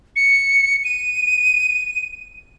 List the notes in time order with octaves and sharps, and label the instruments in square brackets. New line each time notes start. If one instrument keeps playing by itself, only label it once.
[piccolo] C#7
D#7